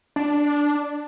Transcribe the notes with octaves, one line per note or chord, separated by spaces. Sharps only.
D4